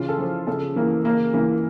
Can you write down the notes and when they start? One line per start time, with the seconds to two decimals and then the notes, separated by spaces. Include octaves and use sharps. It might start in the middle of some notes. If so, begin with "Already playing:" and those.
Already playing: C#3 E3 F4
0.09 A4
0.18 F3
0.47 C#3 A4
0.76 E3 A#3
1.05 C#3 A#3
1.34 E3 A#3